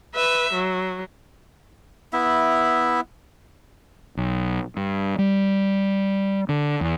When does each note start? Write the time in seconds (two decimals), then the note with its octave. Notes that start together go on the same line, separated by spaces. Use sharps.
0.15 B4 E5
0.53 F#3
2.13 B3 E4 E5
4.17 B1
4.77 G2
5.19 G3
6.49 D3
6.81 E2